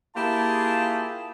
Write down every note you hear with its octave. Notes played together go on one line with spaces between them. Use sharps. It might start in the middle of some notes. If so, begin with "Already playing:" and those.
A#3 E4 F4 G4 G#4 A5